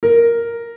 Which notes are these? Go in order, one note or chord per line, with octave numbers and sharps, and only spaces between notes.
A#4